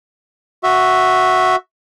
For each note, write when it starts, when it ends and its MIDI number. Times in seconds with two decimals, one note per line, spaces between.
0.63 1.56 66
0.63 1.56 76